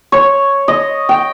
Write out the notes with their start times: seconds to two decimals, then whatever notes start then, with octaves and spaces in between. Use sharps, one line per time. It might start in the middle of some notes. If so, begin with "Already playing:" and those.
0.12 C#5
0.68 D#5
1.09 G5